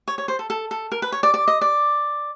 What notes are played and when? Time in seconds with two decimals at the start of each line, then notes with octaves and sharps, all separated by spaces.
0.08 C#5
0.18 C#5
0.28 C5
0.39 A4
0.50 A4
0.71 A4
0.92 A#4
1.02 B4
1.12 C#5
1.23 D5
1.34 D5
1.48 D#5
1.61 D5